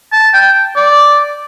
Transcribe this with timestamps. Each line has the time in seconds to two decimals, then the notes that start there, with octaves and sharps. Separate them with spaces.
0.12 A5
0.34 G5
0.76 D5